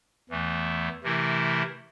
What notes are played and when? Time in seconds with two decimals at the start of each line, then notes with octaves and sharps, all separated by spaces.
0.30 E2 E3 A3
1.03 C3 E3 A3 E4 A#4